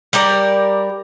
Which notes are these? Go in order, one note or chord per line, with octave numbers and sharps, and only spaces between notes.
G3 G4 A#4 D5